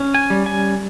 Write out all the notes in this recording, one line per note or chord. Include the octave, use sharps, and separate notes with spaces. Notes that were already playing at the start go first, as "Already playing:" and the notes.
Already playing: C#4
G#5
G3
G#5